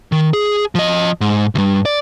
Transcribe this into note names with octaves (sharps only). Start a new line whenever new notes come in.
D#3
G#4
F3 D#5
G#2
D2 G2
D5